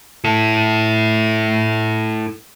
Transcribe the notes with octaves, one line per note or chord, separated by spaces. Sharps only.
E4 A4